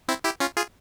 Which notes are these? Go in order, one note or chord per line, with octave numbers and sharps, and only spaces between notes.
C4 E4
E4 G4
C#4 F4
F4 G#4